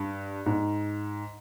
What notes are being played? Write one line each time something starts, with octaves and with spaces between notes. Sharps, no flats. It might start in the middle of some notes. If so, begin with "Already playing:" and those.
Already playing: G2
G#2